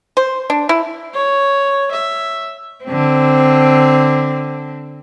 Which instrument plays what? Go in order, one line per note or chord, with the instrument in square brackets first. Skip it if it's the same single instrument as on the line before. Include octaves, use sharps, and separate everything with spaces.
[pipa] C5
D4
E4
[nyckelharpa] C#5
E5
[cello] D3 C4